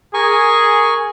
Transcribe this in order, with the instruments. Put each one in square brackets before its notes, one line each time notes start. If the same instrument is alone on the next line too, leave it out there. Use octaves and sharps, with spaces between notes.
[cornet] G#4 [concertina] A#4 G#5 C#6